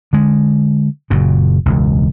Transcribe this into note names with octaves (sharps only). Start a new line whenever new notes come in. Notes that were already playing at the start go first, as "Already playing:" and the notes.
D3 G#3
F#1 A#2 C#3
E1 C#2